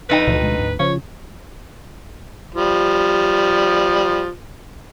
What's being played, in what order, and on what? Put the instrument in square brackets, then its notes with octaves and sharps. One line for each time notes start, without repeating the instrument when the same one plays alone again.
[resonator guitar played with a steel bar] F2 D#4 G5 [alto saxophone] B4
[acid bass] D2 [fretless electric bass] A#2 E3 F3
[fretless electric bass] B2 G#3
G#2
[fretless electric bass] C#3 C#4 [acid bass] F3 [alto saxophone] C#5
[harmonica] F3 G3